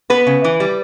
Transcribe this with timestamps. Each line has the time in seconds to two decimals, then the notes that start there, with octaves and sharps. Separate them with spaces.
0.10 B3 B4
0.27 C#3
0.44 E3
0.60 G3